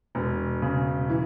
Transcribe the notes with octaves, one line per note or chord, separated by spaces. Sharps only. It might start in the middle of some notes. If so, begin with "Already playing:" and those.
E1
C#3
E3